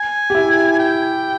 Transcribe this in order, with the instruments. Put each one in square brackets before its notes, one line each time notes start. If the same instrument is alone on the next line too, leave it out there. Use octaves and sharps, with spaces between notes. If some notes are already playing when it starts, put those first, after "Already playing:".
Already playing: [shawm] G#5
[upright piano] G4
E4
[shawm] G5